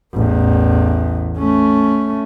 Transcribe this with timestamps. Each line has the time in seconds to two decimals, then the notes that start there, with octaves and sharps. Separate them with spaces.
0.14 A1 E2
1.37 A3 C#4